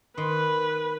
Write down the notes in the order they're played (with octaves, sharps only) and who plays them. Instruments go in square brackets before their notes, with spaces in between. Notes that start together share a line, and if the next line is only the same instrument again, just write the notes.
[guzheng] D#3 C6 [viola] B4